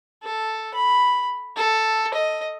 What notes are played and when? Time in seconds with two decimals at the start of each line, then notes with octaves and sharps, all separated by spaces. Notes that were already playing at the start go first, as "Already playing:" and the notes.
0.23 A4
0.74 B5
1.56 A4
2.14 D#5